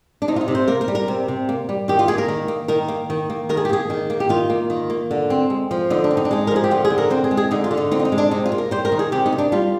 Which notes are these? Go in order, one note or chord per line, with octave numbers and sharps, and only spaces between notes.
D4
C3 D#4
F4
D#4
C3
C5
A#3 A#4
A#4
G3
A#4
C3
C3
A#3
G3
D#3 G4
F4
A#3 G#4
A#4
D#3
A#3
D#3 A#4
A#3
D#3
A#3
D#3 A#4
G#4
G4
A#3 G#4
D#3
A#3
G4
D#3 F4
A#3
D#3
A#3
D3
C4
G#3
F3
D3 D#4
D4
C4
D#4
D4
G#3 D#4
A#4
F3 G#4
G4
D3 F4
G#4
D3
A#4
C4 C5
G#4
G#3
G#4
D3 D#4
F4
D3
D#4
C4 D#4
F4
D#4
G#3
D4
C3 D#4
F4
A#3
A#4
G3 C5
A#4
D#3
G#4
C3 G4
D#4
A#3
D4
G3 F4